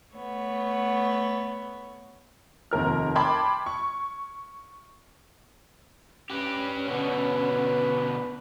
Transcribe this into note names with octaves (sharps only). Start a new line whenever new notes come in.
A3 B3 C#5
F1 D#2 A#4 F6
G5 A5 B5 C6 D6 G#6
C#6
C#4 G4 B4
B2 D3 B4